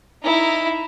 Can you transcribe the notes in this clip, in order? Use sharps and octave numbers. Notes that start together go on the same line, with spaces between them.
D#4 E4